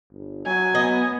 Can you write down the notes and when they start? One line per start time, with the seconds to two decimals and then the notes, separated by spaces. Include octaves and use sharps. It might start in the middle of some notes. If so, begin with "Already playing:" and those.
0.11 G1
0.46 F#3 G#5
0.75 B3 D#5